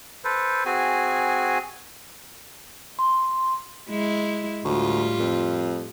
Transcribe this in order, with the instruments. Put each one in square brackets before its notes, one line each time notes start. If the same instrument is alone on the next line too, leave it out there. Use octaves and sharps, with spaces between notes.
[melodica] A4 B4 C5
C4 F#4 G#4 G#5
[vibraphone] C6
[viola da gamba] G#3 E4
[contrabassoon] D2 [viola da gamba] A2 G3 F4
[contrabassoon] F2